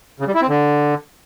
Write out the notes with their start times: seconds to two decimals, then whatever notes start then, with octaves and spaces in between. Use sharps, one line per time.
0.20 C#3
0.27 G3
0.35 E4
0.42 C4
0.49 D3